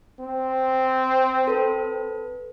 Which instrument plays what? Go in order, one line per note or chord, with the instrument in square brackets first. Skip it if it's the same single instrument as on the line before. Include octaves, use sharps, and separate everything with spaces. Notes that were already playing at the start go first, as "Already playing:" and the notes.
[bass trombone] C4
[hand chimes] A4 B4